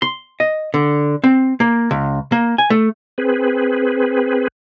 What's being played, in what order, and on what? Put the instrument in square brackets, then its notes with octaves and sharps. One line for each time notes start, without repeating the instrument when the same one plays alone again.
[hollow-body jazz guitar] C6
D#5
D3
C4
A#3
C#2
A#3
G#5
A3
[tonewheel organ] C4 G#4 B4